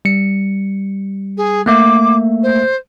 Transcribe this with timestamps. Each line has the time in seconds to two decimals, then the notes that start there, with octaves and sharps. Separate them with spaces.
0.05 G3 C#7
1.37 G#4
1.66 A3 A#3 E5 D6
2.43 C5